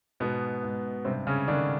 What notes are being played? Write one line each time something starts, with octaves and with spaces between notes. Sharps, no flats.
G#2 B2 B3
G#2
G2 C3 C4
C#3 C#4
D3 D#3 D4